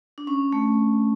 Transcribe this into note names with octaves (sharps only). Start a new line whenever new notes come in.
D4
C#4
A3